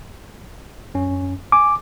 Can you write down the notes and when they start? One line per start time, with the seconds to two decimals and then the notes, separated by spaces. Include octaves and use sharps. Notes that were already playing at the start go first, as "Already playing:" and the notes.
0.95 F#2 C#4
1.52 G#5 D6